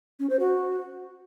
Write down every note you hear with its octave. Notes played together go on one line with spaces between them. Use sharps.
C#4
C5
F#4